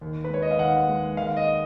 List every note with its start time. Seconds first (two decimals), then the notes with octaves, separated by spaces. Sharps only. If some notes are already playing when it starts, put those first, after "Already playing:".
0.01 D#2
0.24 B4
0.30 G#3 C#5
0.42 D#5
0.51 F5
0.59 D#2 F#5
0.89 G#3
1.17 D#2 F5
1.37 D#5